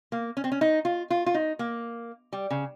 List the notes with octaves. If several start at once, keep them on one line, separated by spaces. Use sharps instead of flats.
A#3
C#4
C4
C#4
D#4
F4
F4
F4
D#4
A#3
G3
C#3